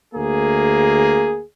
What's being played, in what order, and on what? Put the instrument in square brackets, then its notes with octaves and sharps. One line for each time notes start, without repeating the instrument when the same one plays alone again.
[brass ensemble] D2 A#3 G#4